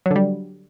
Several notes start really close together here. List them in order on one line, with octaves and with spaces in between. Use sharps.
F#3 D3 G3